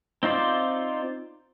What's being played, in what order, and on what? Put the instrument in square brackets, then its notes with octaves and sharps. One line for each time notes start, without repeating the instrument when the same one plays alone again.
[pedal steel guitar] C4 D#4 F4 C5 D5